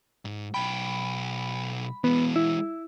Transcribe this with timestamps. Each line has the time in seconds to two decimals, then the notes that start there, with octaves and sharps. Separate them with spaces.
0.25 G#2
0.54 B1 G5 B5
2.04 E3 G#3 B3
2.36 E4